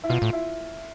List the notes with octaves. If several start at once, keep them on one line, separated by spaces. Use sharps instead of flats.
E4
B2 F4
A2
E4